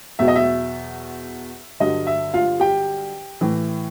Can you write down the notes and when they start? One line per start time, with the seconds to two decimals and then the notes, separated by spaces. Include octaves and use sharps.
0.19 E2 B2 F#3 E5
0.28 D#5
0.36 E5
1.80 G2 D3 F#3 D#5
2.07 E5
2.34 F4 F5
2.60 G4 G5
3.41 A2 E3